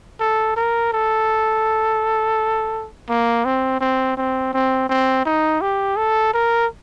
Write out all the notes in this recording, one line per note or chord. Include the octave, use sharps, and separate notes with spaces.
A4
A#4
A4
A#3
C4
C4
C4
C4
C4
D#4
G4
A4
A#4